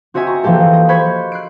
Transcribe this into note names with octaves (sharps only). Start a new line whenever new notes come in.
C4 F#4 D#5 E5 G#5
A#5 C#6
E3 F3 A#3 G4 A4
D#5
C5 B5 C#6 F#6 G#6
F#6 C7 D7